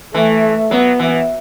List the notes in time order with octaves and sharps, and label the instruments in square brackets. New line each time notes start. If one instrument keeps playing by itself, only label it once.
[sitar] E3 [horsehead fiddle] A3
[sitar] F#3 [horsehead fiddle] B3
[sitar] E3